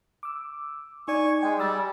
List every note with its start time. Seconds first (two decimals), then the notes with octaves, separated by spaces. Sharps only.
0.23 D6 E6
1.08 D#4 D5 G#5 C#6
1.43 G#3 G5 G#5
1.58 G3 D6 E6 A6